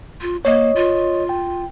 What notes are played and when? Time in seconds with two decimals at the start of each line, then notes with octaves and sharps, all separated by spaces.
0.21 F4
0.45 A#3 C#5 D#5
0.76 F4
1.29 G5